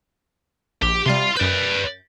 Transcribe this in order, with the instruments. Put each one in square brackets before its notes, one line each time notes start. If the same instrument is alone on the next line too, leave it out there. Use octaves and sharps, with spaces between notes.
[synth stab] A#1 [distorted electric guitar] G4
[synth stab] C3 G3 [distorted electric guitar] F5 C6
[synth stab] F#2 G6 [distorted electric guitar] B4 D5